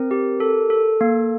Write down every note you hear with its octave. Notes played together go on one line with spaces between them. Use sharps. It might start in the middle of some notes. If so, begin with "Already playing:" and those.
Already playing: C4 A#4
G4
A4
A4
A#3